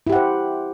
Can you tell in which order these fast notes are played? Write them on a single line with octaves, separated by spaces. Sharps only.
E4 G4 F#5 C5